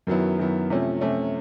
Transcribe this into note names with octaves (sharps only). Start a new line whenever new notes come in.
F#2 D#3 F#3 B3 E4
F#2 D#3 F#3 B3 E4
C3 F3 A3 C#4
C3 F3 A3 C#4